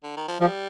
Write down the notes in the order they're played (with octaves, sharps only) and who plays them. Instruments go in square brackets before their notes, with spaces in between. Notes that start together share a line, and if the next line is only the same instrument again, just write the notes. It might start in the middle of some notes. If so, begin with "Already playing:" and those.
[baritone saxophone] D3
D#3
F3
[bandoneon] F3 [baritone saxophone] G3